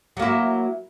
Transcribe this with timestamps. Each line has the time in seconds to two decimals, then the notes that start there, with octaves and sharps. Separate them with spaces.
0.17 F#3
0.19 A#3
0.22 E4